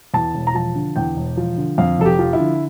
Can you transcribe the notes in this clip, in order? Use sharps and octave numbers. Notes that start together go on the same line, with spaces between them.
E2 A5
E1
A#5
F3 A5
D3
E2 G5
E1
F3
D3
F2 F5
F1 A4
G4
F3
E4
D3